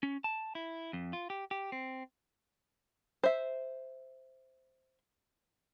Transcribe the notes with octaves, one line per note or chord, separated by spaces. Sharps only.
C#4
A5
E4
F2
F4
G4
G4
C4
C5 E5